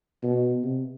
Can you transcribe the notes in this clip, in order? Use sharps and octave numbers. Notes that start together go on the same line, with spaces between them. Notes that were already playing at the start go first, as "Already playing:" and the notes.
B2
C3